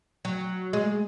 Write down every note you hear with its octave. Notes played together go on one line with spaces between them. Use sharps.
F#3
G#3